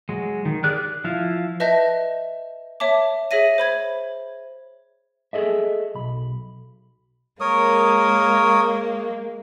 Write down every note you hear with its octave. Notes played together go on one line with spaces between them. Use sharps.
F#3 G#3
D#3
G4 G#4 A#4 D5 F#6
F#6
F3 E4 F5
B4 D#5 E5 A5 G6 A#6
C#5 E5 A5 D6
G#4 C#5 E5 A#6 D#7
C5 B5 G#6
G#4 A4 D#5 E5
B1 B5
G#3 A#3 A#4 C#5 D#6